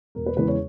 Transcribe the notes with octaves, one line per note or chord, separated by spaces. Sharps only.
E1 A#4
B4
E2 C#3 G#3 B4
C#5